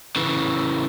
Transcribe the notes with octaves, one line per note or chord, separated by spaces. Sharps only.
C#3 E3